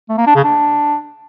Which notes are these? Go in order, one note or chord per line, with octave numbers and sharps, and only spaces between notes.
A3
A#3
D4
C#3
D4